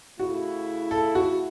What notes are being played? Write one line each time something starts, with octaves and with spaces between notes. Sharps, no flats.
C#3 A3 E4 F#4
A4
F#4